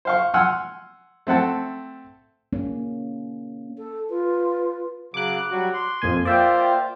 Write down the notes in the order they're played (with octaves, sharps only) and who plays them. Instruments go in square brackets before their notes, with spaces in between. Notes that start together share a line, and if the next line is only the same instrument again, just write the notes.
[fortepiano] C5 F5 C#6
F#5 G#5 C6 E6 F6
A3 C4 F#5 A5
[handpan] A#3 C#4
[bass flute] A4
[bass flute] F4 [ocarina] B4
[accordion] C#3 F#3 [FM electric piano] D6 F#6
[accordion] F#3 G3 F#4
C6
[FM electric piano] F2 A#2 G#5
[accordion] A#3 F4 C5 [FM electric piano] D5 E5 G5